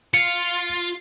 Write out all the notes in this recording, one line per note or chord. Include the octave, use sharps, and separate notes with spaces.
F4 C#7